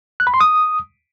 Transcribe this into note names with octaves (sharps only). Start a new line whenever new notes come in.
F#6
B5
C6
D#6